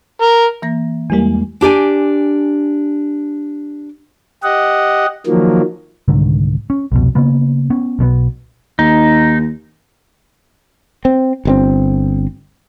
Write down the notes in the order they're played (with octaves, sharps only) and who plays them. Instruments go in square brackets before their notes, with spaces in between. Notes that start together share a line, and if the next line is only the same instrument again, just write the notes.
[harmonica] A#4
[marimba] E3 A#3 A#6
[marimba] E2 G#3 [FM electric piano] E3 G3 A#3
[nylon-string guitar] D4 G4 D5 G#5
[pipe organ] G4 D#5 F#5
D#3 F3 F#3 A#3
[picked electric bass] C2 G#2 D3 D#3
C#4
C2 F2 B2
C#3 A#3 B3
B3 C#4
B1 B2 D3 B3
[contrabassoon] D#2 [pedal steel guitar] D#4
[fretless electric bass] C4
G1 B2 C4